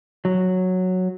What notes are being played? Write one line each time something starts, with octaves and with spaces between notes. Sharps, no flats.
F#3